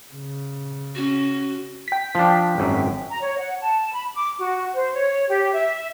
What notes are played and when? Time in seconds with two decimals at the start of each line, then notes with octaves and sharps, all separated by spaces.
0.13 C#3
0.95 C#4 F#4
1.88 G5 B6
2.15 F3 D4
2.58 G#1 F#2
3.10 A#5
3.21 C#5
3.39 F#5
3.63 A5
3.93 B5
4.15 D6
4.39 F#4
4.75 C5
4.93 C#5
5.29 G4
5.53 E5